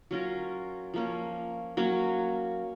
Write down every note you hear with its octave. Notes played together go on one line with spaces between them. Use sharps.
F#3 C#4 F4 A#4
F3 A#3 C#4
F#3 A#3 C#4